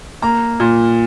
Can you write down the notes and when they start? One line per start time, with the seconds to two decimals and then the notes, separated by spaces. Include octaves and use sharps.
0.22 A#3 A#5
0.60 A#2